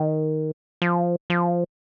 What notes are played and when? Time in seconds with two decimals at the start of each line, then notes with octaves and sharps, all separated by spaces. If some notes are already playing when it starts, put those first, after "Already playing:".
Already playing: D#3
0.82 F3
1.30 F3